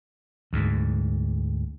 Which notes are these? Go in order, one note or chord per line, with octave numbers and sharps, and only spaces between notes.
D2 G#2